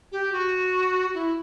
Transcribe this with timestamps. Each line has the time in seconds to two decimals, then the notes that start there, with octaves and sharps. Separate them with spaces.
0.12 G4
0.32 F#4
1.14 E4